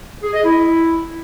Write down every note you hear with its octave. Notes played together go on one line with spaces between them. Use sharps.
G#4
D#5
E4